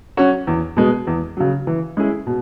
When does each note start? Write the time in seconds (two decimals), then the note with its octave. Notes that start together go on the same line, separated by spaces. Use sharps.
0.17 F#3 C#4 F#4 C#5
0.47 E2
0.76 B2 G#3 B3
1.07 E2
1.37 C#3 F#3
1.67 E3
1.97 G#3 C#4 E4 G#4
2.26 B2